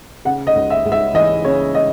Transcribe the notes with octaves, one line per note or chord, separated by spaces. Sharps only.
C#3 F#5
D#5
C#2
E5
C#2
E5
E3 D#5
C#3 C#5
D#5